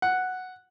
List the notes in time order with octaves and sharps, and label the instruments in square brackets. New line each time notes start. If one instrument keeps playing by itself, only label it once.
[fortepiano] F#5